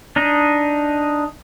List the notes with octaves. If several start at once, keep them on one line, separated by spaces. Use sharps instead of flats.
D4 D#4 D#5